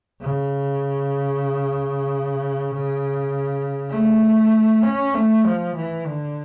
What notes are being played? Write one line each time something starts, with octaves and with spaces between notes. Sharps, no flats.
C#3
A3
C#4
A3
F3
E3
D3